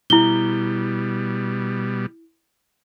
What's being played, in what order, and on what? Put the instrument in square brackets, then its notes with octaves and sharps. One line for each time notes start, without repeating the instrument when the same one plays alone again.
[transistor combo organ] B2 G3 [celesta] E4 G7